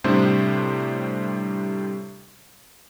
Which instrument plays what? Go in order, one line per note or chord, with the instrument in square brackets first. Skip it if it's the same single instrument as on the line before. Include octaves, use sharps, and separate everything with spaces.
[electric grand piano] A2 C3 G3 D4 C5